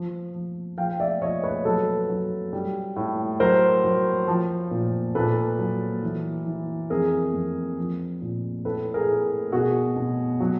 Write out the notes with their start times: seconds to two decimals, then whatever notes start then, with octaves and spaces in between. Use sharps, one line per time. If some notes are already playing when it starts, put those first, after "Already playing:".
Already playing: F3
0.34 F3
0.77 F3 F5 G5
1.00 D5 E5
1.22 F3 C#5 D#5
1.44 B4 C#5
1.65 F#3 A4 B4
2.10 F#3
2.53 G3
2.96 A2
3.40 F#3 A#4 C5
3.84 F#3
4.28 F3
4.71 A#2
5.15 A#2 A4 B4
5.59 F#3
6.03 E3
6.46 E3
6.90 F2 G#4 A#4
7.33 F2
7.77 F3
8.22 A#2
8.65 A2 A4 B4
8.94 G#4 A#4
9.09 A2
9.52 B2 F#4 G#4
9.96 B2
10.40 F#3